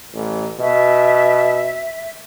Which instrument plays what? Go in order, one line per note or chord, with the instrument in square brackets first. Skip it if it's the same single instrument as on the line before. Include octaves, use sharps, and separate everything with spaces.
[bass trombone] A1
[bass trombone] B2 [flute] E5